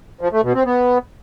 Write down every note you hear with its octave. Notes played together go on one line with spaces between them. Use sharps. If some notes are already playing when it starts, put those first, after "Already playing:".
F3
A3
B2
C4
B3